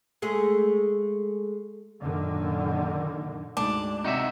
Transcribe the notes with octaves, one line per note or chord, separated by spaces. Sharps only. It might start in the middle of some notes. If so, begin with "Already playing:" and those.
G#3 A3 G#4
F#2 A#2 D3 D#3
D2 G#2 D4
C3 D#4 F#4 E5